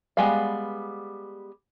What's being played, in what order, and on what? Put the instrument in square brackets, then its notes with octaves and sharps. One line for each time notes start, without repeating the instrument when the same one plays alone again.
[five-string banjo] G3 G#3 B3 B4 F5